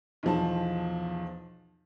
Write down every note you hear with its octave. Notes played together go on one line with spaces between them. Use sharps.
B1 E2 F3 A5